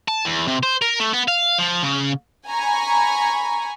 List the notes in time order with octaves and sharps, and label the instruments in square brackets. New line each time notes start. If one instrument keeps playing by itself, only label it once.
[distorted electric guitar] A5
E2
C3
C5
A#4
A3
B3
F5
F3
C#3
[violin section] G#5 A#5 B5 C#6